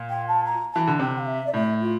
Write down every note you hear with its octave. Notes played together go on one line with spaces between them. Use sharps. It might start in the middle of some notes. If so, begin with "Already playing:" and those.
Already playing: A#2
G5
A5
A#5
E3 A5
D3
C3 G5
F5
E5
D5
A2 E5
F4